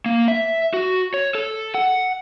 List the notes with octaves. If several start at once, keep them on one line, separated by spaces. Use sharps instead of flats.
A#3
E5
F#4
C#5
A4
F#5